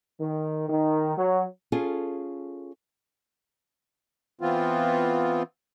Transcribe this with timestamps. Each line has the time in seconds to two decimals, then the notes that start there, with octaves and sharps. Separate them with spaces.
0.20 D#3
0.68 D#3
1.18 F#3
1.72 C#4 F4 G#4 A4
4.41 E3 B3 C4 F4